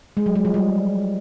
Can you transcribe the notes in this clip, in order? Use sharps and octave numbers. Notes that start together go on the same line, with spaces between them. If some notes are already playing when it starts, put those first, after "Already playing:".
G#3
F#3
G#3
F3
G3